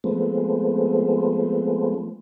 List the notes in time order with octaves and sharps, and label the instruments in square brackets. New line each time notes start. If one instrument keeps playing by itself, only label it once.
[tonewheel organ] F3 G#3 A3 B3 C4